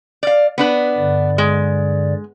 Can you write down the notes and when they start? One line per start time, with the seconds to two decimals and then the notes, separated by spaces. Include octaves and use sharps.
0.23 D5 F5
0.58 B3 D4 B4
0.97 G2 D3 D5
1.38 G#3